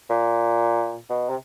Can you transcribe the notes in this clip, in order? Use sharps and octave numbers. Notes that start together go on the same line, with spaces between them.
A#2
B2
C3